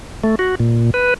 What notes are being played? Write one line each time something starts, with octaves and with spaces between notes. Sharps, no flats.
A3
F#4
A#2
B4